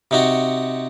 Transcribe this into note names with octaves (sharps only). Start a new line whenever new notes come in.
C3 D#4 F#4